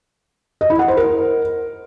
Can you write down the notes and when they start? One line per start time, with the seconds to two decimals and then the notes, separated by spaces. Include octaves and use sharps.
0.61 D#5
0.70 E4
0.79 F#5
0.88 C5
0.97 A#4